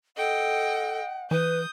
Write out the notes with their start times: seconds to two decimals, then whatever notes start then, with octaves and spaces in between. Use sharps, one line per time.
0.17 A4 D#5 F#5 G5
1.31 E3 B4 D#6 G6